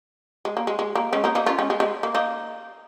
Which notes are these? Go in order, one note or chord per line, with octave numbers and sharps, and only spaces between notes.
G#3
A#3
G#3
G#3
A#3
G#3 C#4
A#3 D#4
A#3 D#4
C#4 F4
G#3 C#4
G#3
G#3
A#3
A#3 D#4